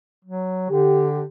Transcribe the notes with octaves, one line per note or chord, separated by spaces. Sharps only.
F#3
D3 G4